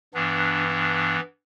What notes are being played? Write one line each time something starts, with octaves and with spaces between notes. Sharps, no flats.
G2 E3 B3 D4
D4